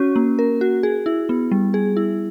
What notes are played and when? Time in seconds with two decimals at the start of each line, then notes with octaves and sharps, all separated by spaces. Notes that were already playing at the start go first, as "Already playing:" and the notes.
Already playing: C#4 F#4
0.16 A#3
0.39 A#4
0.61 F#4
0.83 G#4
1.06 E4
1.29 B3
1.51 G3
1.74 G#4
1.97 E4